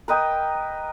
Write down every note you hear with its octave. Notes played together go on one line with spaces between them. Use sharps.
A#4 B4 D#5 G5